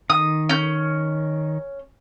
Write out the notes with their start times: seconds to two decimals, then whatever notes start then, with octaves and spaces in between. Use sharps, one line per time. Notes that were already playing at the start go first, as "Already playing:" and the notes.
0.10 D#3 D#6
0.49 C#4 G6